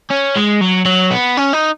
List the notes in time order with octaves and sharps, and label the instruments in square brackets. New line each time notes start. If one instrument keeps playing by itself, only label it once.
[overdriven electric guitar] C#4
G#3
F#3
F#3
B3
C#4
D#4